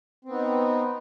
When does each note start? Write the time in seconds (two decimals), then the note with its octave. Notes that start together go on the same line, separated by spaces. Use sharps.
0.25 C4
0.29 B3
0.33 D#4